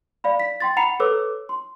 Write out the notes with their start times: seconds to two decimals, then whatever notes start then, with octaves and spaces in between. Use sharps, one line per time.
0.24 D5 F5 B5
0.40 B6
0.60 G5 C6 A6
0.77 F#5 A#5 B5 C7 C#7 F7
1.00 A4 B4 C#5 D6 E6
1.49 C6